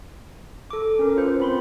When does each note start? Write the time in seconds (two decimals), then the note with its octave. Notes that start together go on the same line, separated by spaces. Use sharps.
0.71 A4 D6
0.99 C#4 A#4
1.16 F4 B4 C5
1.40 C4 B5 C6